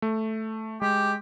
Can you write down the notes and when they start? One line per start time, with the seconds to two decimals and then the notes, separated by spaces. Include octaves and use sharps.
0.02 A3
0.82 G#3 G4